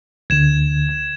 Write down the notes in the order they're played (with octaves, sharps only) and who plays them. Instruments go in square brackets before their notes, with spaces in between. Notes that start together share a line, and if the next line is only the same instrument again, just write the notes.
[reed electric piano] D2 D3 [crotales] G#6 E7